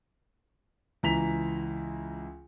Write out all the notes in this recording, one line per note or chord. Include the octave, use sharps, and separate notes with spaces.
C#2 E3 A#5 B6 F7